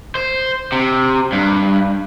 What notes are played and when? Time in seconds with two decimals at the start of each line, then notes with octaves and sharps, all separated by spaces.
0.15 C5
0.72 C3
1.32 G2